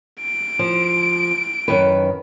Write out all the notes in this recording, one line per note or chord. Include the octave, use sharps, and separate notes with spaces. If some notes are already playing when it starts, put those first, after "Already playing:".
D7
F3
F#2 D#3 B4